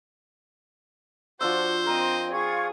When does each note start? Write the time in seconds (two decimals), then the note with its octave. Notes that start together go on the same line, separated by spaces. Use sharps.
1.41 F3 D4 F#4 C5 E6
1.86 C4 A#4 D#5
2.31 F4 G#4 C#6 G#6